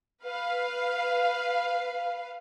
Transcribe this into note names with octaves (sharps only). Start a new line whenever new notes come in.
B4 F5